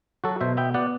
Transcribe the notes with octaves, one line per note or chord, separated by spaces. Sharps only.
F#3 F#4 A4
B2 C5 E5
B3 E5 G5
B3 D5 F#5